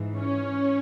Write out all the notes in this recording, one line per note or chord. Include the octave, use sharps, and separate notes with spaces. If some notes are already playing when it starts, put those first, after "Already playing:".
Already playing: G#2 E3
C#4